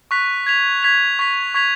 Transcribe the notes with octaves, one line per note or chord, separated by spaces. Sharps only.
C#6 F#6 B6 F7
G#6 B6 F7
G#6 B6 F7
C#6 G#6 B6 F7
C#6 G#6 B6 F7